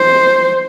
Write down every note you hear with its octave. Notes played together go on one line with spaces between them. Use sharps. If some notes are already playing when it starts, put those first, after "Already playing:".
Already playing: C5